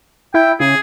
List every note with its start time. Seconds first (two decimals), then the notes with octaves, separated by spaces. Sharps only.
0.34 E4 G5
0.60 C#3 G#4